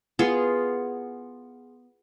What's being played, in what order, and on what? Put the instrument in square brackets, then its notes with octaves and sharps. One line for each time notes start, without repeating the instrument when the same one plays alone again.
[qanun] B3 F4 G#4